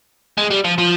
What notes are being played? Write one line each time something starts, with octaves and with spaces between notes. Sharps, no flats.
G#3
G3
F3
F3